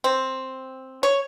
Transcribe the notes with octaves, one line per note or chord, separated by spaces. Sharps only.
C4
C#5